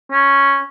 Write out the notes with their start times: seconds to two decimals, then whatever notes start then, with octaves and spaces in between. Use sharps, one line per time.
0.11 C#4